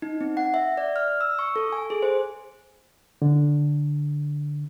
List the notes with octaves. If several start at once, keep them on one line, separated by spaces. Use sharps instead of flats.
D#4
C4
F#5
E5
D5
F6
E6
C#6
A4
G#5
G#4
C5
D3